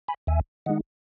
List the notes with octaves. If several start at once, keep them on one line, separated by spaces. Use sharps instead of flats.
G#5 B5
D#2 E5 G#5
D#3 G#3 D#4 D#5 F#5